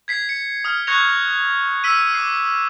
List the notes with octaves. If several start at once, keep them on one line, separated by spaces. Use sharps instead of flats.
G#6 B6 C7
C#7
D#6 F6
C#6 F#6 G#6 A#6 C#7 F7
E6 B6 D#7
D6 C7